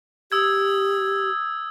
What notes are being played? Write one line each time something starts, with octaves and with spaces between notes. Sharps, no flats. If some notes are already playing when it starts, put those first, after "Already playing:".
G4 D#6 E6 G#6